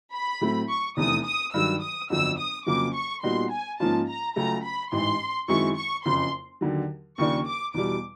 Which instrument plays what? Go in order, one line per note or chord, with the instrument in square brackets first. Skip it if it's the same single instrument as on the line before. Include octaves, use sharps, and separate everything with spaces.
[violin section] B5
[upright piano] A2 F#3 A3 C4 E4
[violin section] C#6
[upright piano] F1 E2 C3 E3 A3 [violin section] D#6
[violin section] D#6
[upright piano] G2 D#3 F#3 [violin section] E6
[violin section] D#6
[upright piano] G1 F2 D3 F#3 [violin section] E6
[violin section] D#6
[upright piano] F2 C#3 F#3 A#3 [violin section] D6
[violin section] C#6
[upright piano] A#2 G3 B3 D#4 F#4 [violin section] C6
[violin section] G#5
[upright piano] G#2 F3 A#3 C#4 F4 [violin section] A5
[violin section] A#5
[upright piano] C#2 C#3 F#3 A3 C#4 [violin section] A#5
[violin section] B5
[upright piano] A1 G#2 E3 [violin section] C6
[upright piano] F#2 D#3 G#3 C4 E4 [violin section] C#6
[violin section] C#6
[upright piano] F#1 F2 C#3 [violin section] C6
[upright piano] D#2 D3 F#3
[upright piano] D#2 C#3 F3 A#3 D4 [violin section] C#6
[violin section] D6
[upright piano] E2 B2 G3 [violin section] D6